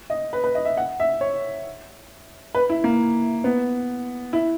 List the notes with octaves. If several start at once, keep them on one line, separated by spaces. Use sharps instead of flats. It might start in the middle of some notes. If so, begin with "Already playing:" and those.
D#5
B4
B4
D#5
E5
F#5
E5
C#5
B4
E4
A#3
B3
E4